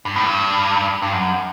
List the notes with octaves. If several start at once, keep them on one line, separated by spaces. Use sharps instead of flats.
G2
A2
G2
G2
F#2